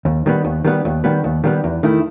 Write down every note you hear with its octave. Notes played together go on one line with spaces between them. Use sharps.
D#2
D#3 G3 B3
D#2
D#3 G3 B3
D#2
D#3 G3 B3
D#2
D#3 G3 B3
E2
D#3 A3 E4